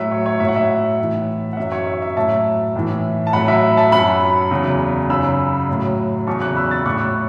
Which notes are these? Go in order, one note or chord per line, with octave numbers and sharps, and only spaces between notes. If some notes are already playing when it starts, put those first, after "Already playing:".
Already playing: A2 F#3 E5
C#5
C#5
A2 F#3 E5
F#5
E5
A2 E3
F#5
F#2 F#3 E5
C#5
E5
E5
A2 F#3 E5 A5
A2 E3
A5
A2 F#3 F#5 B5
E5
E5 A5
F#2 F#3 F#5 B5
E2 C#3 F#3
F#2 C#3 F#3 B5 E6
A2 F#3
E2 C#3 F#3 A5 C#6
C#6 F#6
B5 E6
E6 A6
A2 F#3 C#6 F#6